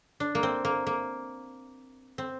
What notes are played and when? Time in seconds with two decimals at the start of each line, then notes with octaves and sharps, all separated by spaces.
0.20 D4
0.35 A#3
0.43 C4
0.65 A#3
0.87 A#3
2.18 C4